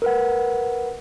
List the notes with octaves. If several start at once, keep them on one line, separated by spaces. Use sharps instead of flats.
A#4 B4 F#5